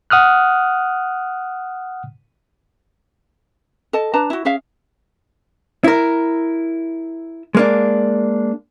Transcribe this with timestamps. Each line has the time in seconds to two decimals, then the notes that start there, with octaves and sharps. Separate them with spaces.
0.10 F#5 D#6 F6 F#6
3.93 A4 D#5 A5
4.14 D4 B4 A5 A#5
4.30 E4 F#4
4.45 C#4 G#4 E5 F5
5.84 E4 A#4
7.55 G#3 A#3 D4